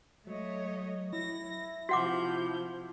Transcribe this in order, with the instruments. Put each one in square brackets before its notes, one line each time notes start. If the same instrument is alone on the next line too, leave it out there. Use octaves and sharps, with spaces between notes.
[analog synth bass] F#3 [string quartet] A3 C#5 D#5
[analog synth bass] E4 [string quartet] A#6
[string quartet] C3 F3 G6 [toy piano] F#4 F#5 D6